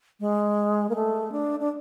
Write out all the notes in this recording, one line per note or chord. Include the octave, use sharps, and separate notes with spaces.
G#3
A#3
A3
D4
D4